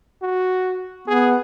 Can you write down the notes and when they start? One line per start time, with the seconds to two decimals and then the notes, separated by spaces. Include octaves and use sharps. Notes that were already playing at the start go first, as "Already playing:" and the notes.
0.22 F#4
1.08 B3 G#4